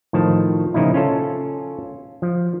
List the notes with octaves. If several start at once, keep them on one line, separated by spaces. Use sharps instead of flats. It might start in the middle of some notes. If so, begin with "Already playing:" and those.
A2 D#3 F3 A5
A#2 C#3 F3 D#4 E4
C#4 F4 A4
F3